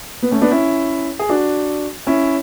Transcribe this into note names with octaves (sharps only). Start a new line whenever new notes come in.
B3
A3 C#4
B3 D4
C#4 E4
G#4
D4 F#4
C#4 E4